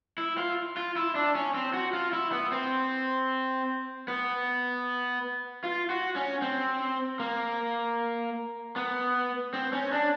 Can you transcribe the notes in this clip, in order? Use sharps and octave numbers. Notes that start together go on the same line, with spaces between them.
E4
F4
F4
E4
D4
C#4
C4
F#4
F4
E4
B3
C4
B3
F4
F#4
C#4
C4
A#3
B3
C4
C#4
D4